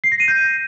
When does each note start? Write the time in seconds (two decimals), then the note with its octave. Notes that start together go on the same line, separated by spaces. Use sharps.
0.04 C7
0.12 A#6
0.20 D#7
0.28 G6